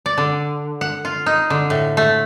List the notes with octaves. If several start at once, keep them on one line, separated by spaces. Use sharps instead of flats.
D5
D3
F#5
F4
D#4
D3
A2
A3